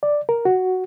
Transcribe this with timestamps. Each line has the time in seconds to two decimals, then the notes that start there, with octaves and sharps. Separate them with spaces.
0.03 D5
0.29 A#4
0.45 F#4